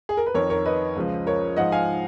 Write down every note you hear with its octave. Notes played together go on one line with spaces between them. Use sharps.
G#4
A#4
B4
F2 D#3 A#4 C#5
A#4 C#5
B4 D#5
C#2 C#3 F3
A#4 C#5
G#2 F3 D#5 F#5
F5 G#5